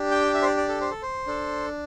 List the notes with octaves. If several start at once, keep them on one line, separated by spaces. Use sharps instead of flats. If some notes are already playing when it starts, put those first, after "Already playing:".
Already playing: D4 G4
G5
E5
C5
D5
D5
A4
C5
A4
C5
D4 A4